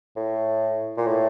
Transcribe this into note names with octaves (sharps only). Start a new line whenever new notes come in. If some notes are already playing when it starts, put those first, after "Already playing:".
A2
A#2
A2